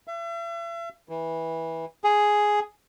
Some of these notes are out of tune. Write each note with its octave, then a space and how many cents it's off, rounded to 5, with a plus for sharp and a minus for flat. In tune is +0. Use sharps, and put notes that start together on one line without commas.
E5 +40
E3 -15
G#4 +5